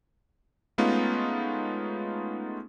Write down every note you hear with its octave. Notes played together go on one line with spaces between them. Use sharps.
G#3 A3 B3 C#4 D#4 F4